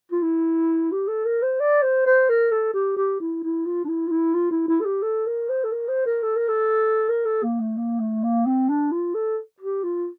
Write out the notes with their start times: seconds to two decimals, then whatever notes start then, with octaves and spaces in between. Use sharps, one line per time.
0.12 F4
0.22 E4
0.92 G4
1.08 A4
1.25 A#4
1.42 C5
1.60 D5
1.82 C5
2.06 C5
2.29 A#4
2.52 A4
2.73 G4
2.96 G4
3.20 E4
3.43 E4
3.66 F4
3.84 D4
3.88 E4
4.07 F4
4.11 E4
4.34 F4
4.51 E4
4.68 E4
4.81 A4
4.85 G4
5.02 A4
5.26 A#4
5.49 C5
5.64 A4
5.72 A#4
5.88 C5
6.06 A#4
6.22 A4
6.36 A#4
6.48 A4
7.09 A#4
7.25 A4
7.43 A#3
7.60 A3
7.77 A#3
7.99 A3
8.23 A#3
8.46 C4
8.69 D4
8.92 F4
9.14 A4
9.60 G4
9.83 F4